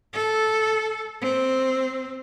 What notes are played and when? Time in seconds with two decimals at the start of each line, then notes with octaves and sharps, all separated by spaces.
0.14 A4
1.22 C4